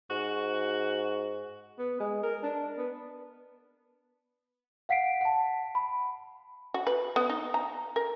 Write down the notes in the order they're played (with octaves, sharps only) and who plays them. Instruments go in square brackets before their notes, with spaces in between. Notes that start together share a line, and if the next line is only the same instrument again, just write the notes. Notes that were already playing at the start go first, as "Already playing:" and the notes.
[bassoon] G#2 [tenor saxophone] F#4
[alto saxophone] B3
G#3
A#4
D4
B3
[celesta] F5 F#5 B6 C7 D7
F#5 A5
B5
[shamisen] F#4
B4
B3
D#4
A#5
A#4